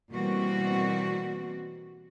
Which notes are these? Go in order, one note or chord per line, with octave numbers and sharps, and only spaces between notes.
B2 E3 G3 A#3 C4 F#4